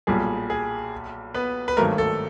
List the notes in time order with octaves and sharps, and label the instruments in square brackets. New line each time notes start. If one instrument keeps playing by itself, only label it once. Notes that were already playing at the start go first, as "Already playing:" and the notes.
[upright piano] B1 A#2 G3 [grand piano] G#4
[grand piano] G#4
B3 B4
B4
[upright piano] G#1 G2 D#3 F#3 A3 [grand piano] A#3 A#4
[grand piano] A4